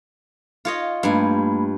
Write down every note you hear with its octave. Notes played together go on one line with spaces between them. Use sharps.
F4 C#5 D#5
G2 A3 A#3 G#5 B5